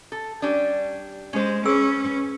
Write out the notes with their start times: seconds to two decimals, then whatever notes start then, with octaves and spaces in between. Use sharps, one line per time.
0.12 A4
0.42 G3 C#4 D4
1.33 G#3 C#4 C5
1.65 C#4 G#4 B4 E6